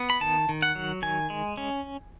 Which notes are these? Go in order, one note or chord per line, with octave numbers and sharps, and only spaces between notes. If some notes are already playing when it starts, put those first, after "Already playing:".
Already playing: B3
B5
D#3 A5
D#3
F#5
F#3
D#3 G#5
G#3
C#4